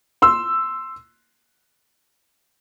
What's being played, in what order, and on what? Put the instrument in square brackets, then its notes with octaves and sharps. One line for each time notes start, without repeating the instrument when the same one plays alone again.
[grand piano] C6 E6